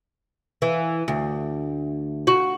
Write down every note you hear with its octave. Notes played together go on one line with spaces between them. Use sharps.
E3
D2
F#4